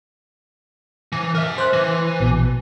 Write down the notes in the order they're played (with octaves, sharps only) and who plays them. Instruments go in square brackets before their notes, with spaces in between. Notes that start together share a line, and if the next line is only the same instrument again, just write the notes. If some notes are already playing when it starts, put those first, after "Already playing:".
[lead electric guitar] E3
A#4 E5
[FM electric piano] C5 F#6
[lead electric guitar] E3
[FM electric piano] A#1 B2